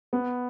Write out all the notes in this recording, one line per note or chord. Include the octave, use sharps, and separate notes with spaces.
B3